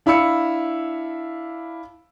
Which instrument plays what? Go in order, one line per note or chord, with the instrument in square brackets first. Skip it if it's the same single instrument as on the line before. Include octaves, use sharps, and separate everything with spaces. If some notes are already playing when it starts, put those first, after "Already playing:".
[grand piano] D4 E4 F5 B5 E6 C#7